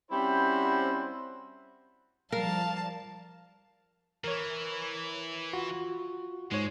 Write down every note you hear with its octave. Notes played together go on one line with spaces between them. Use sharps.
G3 C4 C#4 E4 F#4 C5
F3 G3 A#4 F5 A5
E3 A#4 C#5
F4 F#4
G#2 G#3 C#5